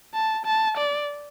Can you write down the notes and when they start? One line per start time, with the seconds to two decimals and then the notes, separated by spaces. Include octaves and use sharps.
0.14 A5
0.45 A5
0.77 D5